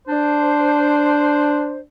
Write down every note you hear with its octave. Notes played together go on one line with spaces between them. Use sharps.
D4 C5